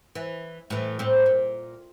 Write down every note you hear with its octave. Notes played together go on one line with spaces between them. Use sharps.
E3
A2 E3
A2 C4
A#2